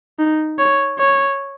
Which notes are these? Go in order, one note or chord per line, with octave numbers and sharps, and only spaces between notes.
D#4
C#5
C#5